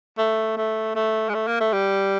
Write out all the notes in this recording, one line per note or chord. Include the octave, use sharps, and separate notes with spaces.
A3
A3
A3
G#3
A3
A#3
A3
G3